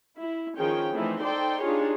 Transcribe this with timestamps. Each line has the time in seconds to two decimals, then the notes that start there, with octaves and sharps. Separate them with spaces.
0.18 E4
0.57 D#3 F3 C#4 G#4 C#5 G5
0.93 E3 F3 A3 C4 D#4 E4
1.23 D#4 A4 C5 D5 G5 C6
1.62 D4 D#4 F4 G4 G#4 C#5